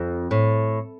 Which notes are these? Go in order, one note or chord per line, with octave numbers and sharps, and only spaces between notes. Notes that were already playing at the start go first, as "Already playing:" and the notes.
Already playing: F2
A2